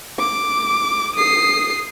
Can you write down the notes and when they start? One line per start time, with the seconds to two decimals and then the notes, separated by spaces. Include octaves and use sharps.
0.19 D6
1.16 D#6 C7